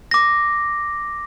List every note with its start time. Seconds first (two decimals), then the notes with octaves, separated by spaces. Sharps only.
0.11 D6 A#6